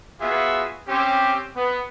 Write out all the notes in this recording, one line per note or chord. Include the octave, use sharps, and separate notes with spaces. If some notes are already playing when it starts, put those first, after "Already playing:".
B3 F4 F#4 G#4 E5
C4 C#4 G4
B3